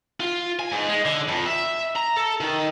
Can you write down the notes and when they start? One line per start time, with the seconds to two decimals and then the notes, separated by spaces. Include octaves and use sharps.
0.20 F4
0.59 G#5
0.72 G#2
0.88 G#3
1.05 D3
1.28 F2
1.46 E5
1.96 A#5
2.16 A4
2.40 D#3